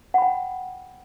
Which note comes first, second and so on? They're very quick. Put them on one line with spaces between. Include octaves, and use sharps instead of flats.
F#5 B5 G5